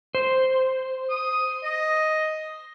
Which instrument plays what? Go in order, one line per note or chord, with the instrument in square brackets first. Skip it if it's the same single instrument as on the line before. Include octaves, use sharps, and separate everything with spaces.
[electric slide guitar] C5
[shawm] D#6
D#5